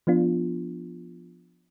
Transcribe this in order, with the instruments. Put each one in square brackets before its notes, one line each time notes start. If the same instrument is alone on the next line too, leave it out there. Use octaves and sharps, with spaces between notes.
[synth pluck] F3 B3 D4 F4